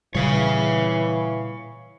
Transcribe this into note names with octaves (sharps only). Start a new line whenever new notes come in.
A#2 C#3 E3 G3 C#5 F5